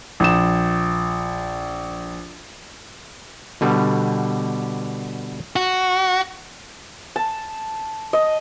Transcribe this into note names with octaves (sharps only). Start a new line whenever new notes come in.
A#1 E7
B2 D3 G3
F#4
A5
D#5